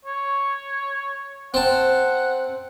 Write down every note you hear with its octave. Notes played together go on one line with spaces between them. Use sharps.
C#5
C4 F#5 A5